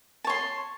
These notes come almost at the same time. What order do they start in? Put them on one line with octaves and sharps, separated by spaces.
A5 C#5 C6